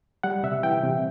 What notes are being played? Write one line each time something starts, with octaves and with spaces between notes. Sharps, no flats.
G3 F#5
C3 E5
E3 G5
C3